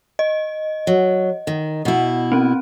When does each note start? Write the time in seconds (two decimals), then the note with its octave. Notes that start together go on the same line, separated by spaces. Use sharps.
0.19 D#5
0.87 F#3
1.47 D#3
1.85 B2 E4
2.32 C4 C#4